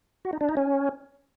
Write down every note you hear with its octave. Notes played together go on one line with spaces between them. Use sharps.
F#4
D#4
D4
D#4
C#4